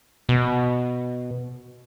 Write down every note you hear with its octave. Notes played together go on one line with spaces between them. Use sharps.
B2